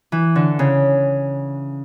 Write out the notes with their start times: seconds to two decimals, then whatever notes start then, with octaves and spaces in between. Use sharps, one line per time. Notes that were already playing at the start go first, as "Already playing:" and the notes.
0.12 E3
0.35 D3
0.59 C#3